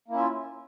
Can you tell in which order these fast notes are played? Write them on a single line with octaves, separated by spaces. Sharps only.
A#3 E4 C#4 E5 F4